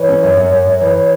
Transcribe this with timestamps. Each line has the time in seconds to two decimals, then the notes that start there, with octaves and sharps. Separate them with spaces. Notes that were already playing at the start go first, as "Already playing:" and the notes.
Already playing: E3 C#5
0.09 C#4
0.23 F#2
0.37 F#2
0.52 F#2
0.67 F#2
0.81 E3